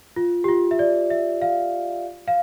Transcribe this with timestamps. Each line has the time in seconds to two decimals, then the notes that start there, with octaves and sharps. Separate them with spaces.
0.16 F4
0.44 G4
0.48 F4
0.71 E5
0.79 D5
1.10 E5
1.42 F5
2.27 F5